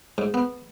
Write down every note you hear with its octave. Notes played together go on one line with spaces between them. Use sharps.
G#2
B3